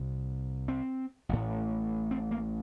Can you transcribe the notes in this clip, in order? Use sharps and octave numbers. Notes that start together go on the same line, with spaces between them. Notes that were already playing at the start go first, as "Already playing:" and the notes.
Already playing: C2 C3
C4
A1 A2
C4
A#3